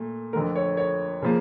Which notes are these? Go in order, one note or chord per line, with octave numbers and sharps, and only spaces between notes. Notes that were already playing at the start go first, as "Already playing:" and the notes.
Already playing: A#2 A3
F2 D3 A3 A#4
C#5
C#5
C#3 F3 A#3